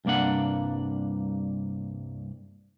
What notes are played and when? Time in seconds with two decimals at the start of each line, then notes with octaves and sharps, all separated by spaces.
0.05 C2 G2 A#3 D4 F#5